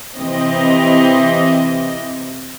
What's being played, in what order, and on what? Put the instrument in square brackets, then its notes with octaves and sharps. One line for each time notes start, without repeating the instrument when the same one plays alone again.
[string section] C3 E3 C4 D#5